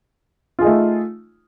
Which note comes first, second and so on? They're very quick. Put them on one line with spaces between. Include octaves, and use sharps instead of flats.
F4 G#4 D#4 A3